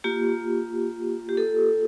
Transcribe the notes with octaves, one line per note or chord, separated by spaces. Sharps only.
A#3 F4 G4
G4
A4